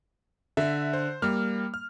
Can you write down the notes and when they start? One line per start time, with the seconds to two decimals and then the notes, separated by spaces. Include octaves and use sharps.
0.57 D3 E5
0.93 C5
1.22 G3 A#3 F6
1.74 F6